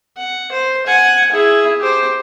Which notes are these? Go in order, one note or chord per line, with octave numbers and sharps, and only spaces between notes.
F#5
C5
F#5 G#5
E4 G#4
G4 C5